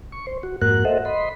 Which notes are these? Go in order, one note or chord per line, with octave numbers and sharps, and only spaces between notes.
C#6
C5
F#4
F2 G#2 A#3 F#4 A#4 F#6
A4 C5 D#5 E5 F#5
D#5 B5 C6